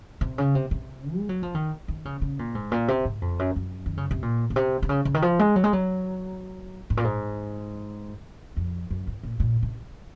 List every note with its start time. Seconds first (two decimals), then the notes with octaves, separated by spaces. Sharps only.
0.21 C3
0.38 C#3
0.55 C3
0.71 C3
1.16 G#3
1.29 F#3
1.43 F3
1.55 D#3
1.88 D#3
2.05 C#3
2.22 C#3
2.39 A#2
2.55 G#2
2.72 A#2
2.88 C3
3.05 G#2
3.22 F2
3.39 F#2
3.56 F#2
3.86 D#3
3.97 C#3
4.11 C3
4.22 A#2
4.50 A#2
4.56 C3
4.82 C3
4.89 C#3
5.05 C#3
5.14 D#3
5.22 F3
5.39 G#3
5.56 F#3
5.64 G#3
5.73 F#3
6.90 G#2
6.97 A#2
7.04 G#2
8.57 F2
8.91 F#2
9.07 G#2
9.23 A#2
9.40 A#2
9.63 C3